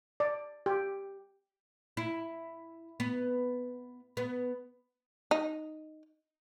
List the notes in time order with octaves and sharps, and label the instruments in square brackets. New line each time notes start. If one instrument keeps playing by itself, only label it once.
[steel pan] D5
G4
[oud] E4
B3
B3
[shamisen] D#4